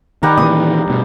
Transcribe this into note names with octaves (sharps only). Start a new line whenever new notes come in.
D#3 G3 F#5 A#5
A#2 D#3 E3 D#6
G2 B2